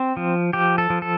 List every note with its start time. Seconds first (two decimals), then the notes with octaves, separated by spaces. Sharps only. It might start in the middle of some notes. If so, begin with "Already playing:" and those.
Already playing: C4 C5
0.17 F3
0.53 F3 G4
0.78 A4
0.90 F3
1.02 A4